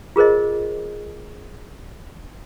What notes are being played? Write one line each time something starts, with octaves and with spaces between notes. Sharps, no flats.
F4 G#4 A#4 C5 D#5